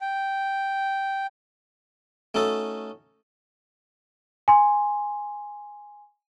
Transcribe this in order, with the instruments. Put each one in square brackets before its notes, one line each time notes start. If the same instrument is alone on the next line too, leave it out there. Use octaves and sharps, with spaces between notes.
[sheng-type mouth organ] G5
[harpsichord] A3 C#4 D#4 F#4 A4
[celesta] G#5 C6